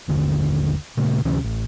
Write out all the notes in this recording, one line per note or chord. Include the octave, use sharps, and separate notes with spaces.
G1 D#2 D3
A#2 C#3 A3
D2 C3 E3 C#4
A1